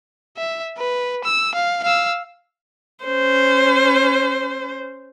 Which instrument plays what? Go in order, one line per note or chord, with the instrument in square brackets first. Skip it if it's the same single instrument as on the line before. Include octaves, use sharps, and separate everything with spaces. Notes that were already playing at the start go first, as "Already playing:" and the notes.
[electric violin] E5
B4
E6
F5
F5 E6
[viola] C#4 C5